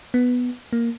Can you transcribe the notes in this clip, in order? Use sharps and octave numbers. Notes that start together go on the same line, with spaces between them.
B3
A#3